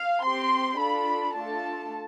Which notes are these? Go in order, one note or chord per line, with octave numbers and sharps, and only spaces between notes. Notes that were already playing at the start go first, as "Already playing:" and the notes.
Already playing: F5
C4 G4 C6
D4 F4 A4 B5
A3 D4 F4 A4 A5